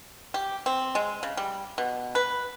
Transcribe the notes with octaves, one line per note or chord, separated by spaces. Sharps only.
G4
C4
G#3
C#3
G3
B2
B4